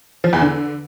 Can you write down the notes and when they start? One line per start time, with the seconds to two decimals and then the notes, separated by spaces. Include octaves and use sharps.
0.24 F3
0.33 E2
0.42 D3